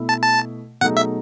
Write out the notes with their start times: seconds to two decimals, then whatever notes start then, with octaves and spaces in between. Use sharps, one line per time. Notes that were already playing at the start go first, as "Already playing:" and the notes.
Already playing: B2 A3 E4
0.09 A5
0.23 A5
0.81 B2 F#3 A3 D#4 G#4 F#5
0.97 E5